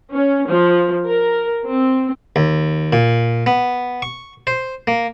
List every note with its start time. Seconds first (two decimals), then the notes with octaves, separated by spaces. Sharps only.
0.11 C#4
0.49 F3
1.06 A#4
1.66 C4
2.36 D#2
2.93 A#2
3.46 B3
4.02 C#6
4.47 C5
4.87 A#3